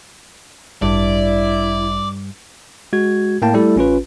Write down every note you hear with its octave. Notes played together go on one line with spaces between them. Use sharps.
A1 G2 E4 D5
G#3 F#4 G#6
A2 A#3 G5 A5
G3 A3 E4 A4
A1 C#4 F4 B4